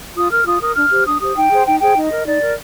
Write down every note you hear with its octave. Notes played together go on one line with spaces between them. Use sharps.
F4 D#6
A#4 F6
F4 D#6
A#4 D#6
D4 F6
G4 C5
D4 D#6
G4 C5 D#6
D#4 G5
G#4 C5
D#4 G5
G#4 C5 G5
D#4 D#5
A#4
D#4 D5
A#4